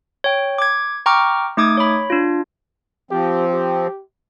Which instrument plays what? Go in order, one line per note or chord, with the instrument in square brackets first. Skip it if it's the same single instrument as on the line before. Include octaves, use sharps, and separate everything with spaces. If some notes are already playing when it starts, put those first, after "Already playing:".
[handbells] C#5 G5
D6 G#6
G5 A#5 C#6 D6 F6
A3 D#4 D6 D#6 G#6
C#5 B5
D4 F4
[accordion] F3 C4 [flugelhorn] G4
[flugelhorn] G4